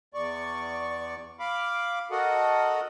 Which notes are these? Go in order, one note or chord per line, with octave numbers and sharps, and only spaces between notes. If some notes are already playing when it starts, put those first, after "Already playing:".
E2 D5 C#6
F5 B5 D6
F#4 A4 A#4 D#5 F#5